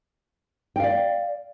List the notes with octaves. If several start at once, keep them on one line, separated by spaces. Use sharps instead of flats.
D5 F5 G5